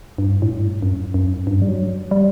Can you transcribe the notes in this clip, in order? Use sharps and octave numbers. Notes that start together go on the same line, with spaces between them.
G2
A2
G2
F#2
F#2
G2
G3
F#3
G3